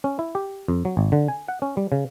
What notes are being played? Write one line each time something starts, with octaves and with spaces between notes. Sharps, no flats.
C#4
E4
G4
F2
F#3
G#1
D3
G#5
F#5
C#4
G3
C#3